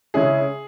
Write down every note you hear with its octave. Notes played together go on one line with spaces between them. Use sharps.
C#3 G#3 C#4 E4 G#4